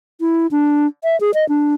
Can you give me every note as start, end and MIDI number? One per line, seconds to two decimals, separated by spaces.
0.21 0.47 64
0.51 0.87 62
1.04 1.19 76
1.21 1.31 68
1.34 1.47 75
1.49 1.74 62